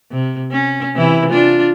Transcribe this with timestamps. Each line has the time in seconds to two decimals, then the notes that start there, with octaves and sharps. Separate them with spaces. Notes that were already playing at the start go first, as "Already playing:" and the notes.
0.11 C3
0.52 C#4
0.94 C3 E3 E4
1.29 D4 F4